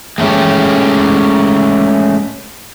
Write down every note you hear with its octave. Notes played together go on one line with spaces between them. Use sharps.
G#3 A3 C#4 G4